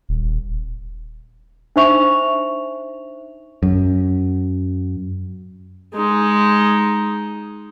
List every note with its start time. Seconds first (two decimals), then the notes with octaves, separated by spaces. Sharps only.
0.09 D#1
1.76 D4 D#4 C5 E5 C#6 F7
3.63 F#2
5.95 G#3 D#4